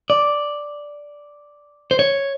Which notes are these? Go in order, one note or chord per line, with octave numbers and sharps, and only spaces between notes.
D5
C5
C#5